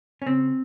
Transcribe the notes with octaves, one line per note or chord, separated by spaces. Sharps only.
C#4
C#3 C4